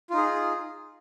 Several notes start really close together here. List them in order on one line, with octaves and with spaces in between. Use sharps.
F4 D#4 G#4